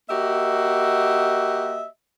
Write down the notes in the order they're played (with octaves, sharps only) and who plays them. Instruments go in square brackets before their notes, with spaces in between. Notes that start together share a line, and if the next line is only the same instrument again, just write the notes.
[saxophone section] A#3 F#4 G4 D#5 E5